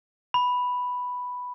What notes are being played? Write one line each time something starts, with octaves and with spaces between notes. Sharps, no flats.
B5